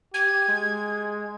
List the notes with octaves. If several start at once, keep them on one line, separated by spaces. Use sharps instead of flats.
G4 G#6
G#3